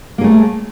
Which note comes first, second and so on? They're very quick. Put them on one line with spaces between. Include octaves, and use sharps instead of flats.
A#3 G#4 A3